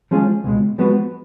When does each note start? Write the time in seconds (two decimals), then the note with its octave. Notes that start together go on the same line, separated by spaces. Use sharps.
0.11 F3 G#3 C#4 F4 G#4
0.44 C#2 B2 G#3
0.78 F3 G#3 B3 F#4 B4